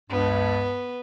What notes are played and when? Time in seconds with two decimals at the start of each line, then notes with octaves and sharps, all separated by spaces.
0.10 C#2 G2 B3